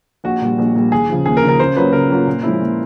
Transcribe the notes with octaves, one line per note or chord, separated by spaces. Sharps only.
A#1 F#4
A#2 G3
A#1
A#2 G3
D#2 G#4
C#3 F3
D#2 G#4
A#4
C#3 F3
A#4
C#3 C5
F#3 A#3 C#4 F4 B4
C#3 A#4
F#3 A#3 C#4 F4
A#2
F3 G#3 C#4 E4
A#2